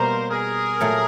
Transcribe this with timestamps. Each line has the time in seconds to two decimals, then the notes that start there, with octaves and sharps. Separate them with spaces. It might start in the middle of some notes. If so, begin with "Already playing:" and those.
Already playing: B2 G3 A#3 A#4 C5
0.30 G#4 A#4
0.80 A#2 F#3 A3